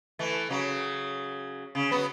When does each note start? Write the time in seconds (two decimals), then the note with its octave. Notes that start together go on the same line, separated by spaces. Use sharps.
0.19 E3 A3
0.50 C#3 F#3
1.75 C#3
1.91 F#3 B3